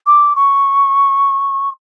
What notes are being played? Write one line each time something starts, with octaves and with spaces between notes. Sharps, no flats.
D6
C#6